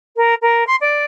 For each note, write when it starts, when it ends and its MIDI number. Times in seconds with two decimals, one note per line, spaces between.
0.16 0.34 70
0.41 0.63 70
0.66 0.75 84
0.80 1.05 74